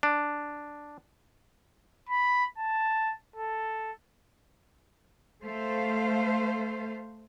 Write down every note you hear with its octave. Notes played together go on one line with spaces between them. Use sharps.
D4
B5
A5
A4
A3 C5 F5